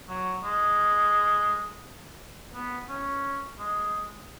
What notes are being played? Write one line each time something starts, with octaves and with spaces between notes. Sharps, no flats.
F#3
G#3
B3
C#4
G#3